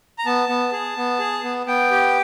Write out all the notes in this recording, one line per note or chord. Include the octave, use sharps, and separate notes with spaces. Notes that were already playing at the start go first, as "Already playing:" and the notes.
A#5
B3 A5
B3
G#4
B3
G#4
B3
B3 G5
G4